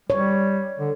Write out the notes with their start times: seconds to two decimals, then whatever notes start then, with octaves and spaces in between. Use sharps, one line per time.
0.10 G3 C#5
0.80 D3